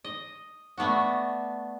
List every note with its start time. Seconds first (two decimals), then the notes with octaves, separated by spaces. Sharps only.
0.04 D#5
0.78 A3 B3 D4 F#4